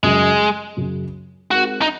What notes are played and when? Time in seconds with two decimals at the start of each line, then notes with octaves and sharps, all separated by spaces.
0.03 F#2 C#3 F#3 G#3
0.77 F#2 C#3 F#3
1.50 G#3 C4 D#4 F#4 A#4
1.82 D#4